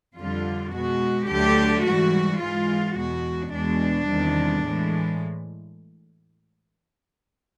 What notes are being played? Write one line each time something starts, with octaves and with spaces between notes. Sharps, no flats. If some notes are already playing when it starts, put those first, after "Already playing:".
F2 D3 G3 F4
B2 G#3 F#4
D2 D3 F#3 A3 G4
G#2 E3 G3 F#4
G#2 E3 G#3 F4
E2 B2 G#3 F#4
E2 B2 G#3 D4
E2 C3 D#3 G3
A2 E3 G#3